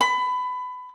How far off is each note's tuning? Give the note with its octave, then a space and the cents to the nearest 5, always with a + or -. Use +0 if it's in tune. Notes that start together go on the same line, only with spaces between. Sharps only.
B5 +25